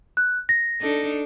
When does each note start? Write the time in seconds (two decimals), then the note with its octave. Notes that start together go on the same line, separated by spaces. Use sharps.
0.17 F#6
0.49 A#6
0.81 D4 D#4 A4